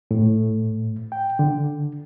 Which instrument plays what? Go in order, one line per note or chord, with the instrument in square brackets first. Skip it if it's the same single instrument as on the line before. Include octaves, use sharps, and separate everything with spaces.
[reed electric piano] A2
G5
D3